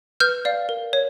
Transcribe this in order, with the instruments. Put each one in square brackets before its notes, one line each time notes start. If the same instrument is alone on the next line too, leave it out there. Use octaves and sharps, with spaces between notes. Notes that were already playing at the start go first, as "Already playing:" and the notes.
[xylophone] B4 F6 G6
D5 F5
A#4
C#5